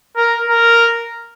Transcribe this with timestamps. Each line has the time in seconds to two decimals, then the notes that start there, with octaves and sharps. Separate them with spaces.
0.17 A#4
0.47 A#4